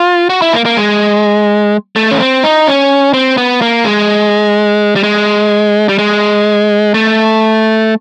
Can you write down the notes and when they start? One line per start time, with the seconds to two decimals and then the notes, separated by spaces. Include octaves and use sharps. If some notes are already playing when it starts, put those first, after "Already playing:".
Already playing: F4
0.30 F#4
0.42 E4
0.53 A#3
0.65 A#3
0.77 G#3
1.96 A3
2.11 C#4
2.19 C4
2.44 D#4
2.67 C#4
3.14 C4
3.37 B3
3.62 A#3
3.85 G#3
4.96 G3
5.03 G#3
5.89 G3
5.99 G#3
6.94 A3